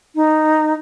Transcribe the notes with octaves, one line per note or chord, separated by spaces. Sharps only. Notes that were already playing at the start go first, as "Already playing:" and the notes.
D#4